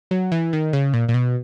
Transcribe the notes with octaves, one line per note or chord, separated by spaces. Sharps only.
F#3
E3
D#3
C#3
A#2
A#2
B2